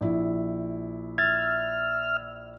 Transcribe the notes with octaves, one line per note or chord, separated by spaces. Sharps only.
A#1 E4
E5 F6 G#6 A6